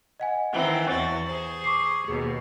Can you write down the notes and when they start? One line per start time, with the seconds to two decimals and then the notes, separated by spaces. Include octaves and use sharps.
0.20 D#5 F#5 G#5
0.53 D#3 E3 C4
0.90 E2 F#4 A6
1.25 G#4 C5
1.64 C#6 D6 C7
2.08 D#2 B2 G#4